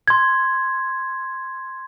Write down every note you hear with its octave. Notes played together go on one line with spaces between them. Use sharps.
C6 G#6